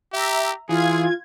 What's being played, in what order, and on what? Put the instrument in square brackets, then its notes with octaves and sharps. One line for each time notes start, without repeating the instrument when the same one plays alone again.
[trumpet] G4 [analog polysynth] E5 A#5
[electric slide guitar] E3 [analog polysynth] F4 G#6 [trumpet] G#4